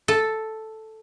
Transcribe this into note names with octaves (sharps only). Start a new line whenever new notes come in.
A4